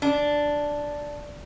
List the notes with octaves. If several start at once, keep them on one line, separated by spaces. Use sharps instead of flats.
D4